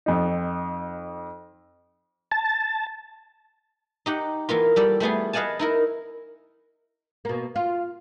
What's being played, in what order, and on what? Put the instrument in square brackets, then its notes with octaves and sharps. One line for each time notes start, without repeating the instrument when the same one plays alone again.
[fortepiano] F2 D#4
[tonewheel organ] A5
[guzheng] D#4 G4 F#5
E3 A#3 B3 F4
G3 A4 D5
G3 A3 B3 G#4
B4 D#5 F5 F#5 G#5 A5
D#4 E4 A#4
[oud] B2 A#3
[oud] F4 [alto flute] F5